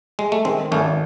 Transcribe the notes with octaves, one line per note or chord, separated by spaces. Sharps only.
G#3
A3
D#3 G#3 C4
G#1 A3 C#4